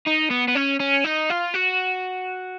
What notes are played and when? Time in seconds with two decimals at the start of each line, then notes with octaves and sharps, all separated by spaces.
0.07 D#4
0.31 B3
0.48 B3
0.55 C#4
0.80 C#4
1.04 D#4
1.30 F4
1.54 F#4